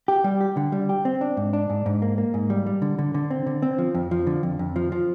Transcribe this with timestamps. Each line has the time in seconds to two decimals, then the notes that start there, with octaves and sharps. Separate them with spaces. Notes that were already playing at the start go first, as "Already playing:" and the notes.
0.08 G4
0.24 G3
0.41 G4
0.57 D3
0.72 G3
0.89 G4
1.05 C4
1.21 D4
1.37 G#2
1.53 D4
1.70 G#2
1.86 G#2
2.02 A#3
2.18 A#3
2.34 G#2
2.50 G3
2.66 G3
2.82 D3
2.99 D3
3.14 D3
3.30 C4
3.46 D3
3.62 C4
3.78 F3
3.94 F2
4.11 F3
4.27 D3
4.43 F2
4.59 F2
4.76 F3
4.92 F3